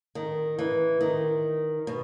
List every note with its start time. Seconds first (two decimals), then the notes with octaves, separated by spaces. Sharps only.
0.15 D#3
0.59 E3
1.01 D#3
1.87 B2